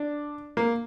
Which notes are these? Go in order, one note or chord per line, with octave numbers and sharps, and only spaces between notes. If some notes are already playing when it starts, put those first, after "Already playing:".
Already playing: D4
A#3